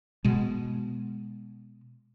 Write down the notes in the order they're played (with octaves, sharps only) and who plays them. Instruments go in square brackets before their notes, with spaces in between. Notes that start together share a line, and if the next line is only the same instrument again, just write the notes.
[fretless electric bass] B2 G#3